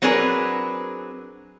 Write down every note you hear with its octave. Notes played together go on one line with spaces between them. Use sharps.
F#3 C4 D4 G#4 A#4 B4